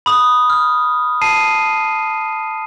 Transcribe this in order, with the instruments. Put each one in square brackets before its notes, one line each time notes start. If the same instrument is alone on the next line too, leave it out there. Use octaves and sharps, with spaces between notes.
[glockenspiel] B5 D#6
F6
A5 C7 D#7